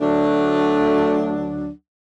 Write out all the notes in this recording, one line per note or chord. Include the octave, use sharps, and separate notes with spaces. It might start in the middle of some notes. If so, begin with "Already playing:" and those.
D2 F#3 A3 D4